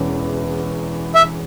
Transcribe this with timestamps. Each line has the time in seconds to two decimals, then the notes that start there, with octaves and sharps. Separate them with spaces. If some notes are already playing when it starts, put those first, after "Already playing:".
Already playing: E1 E2 E3 C#4
1.15 E5